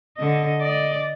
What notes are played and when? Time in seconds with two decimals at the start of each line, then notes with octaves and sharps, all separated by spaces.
0.17 D3 D#5
0.61 D5 D#5